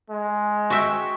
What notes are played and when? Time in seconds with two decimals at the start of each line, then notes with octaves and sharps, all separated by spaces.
0.10 G#3
0.70 F#4 E5 G5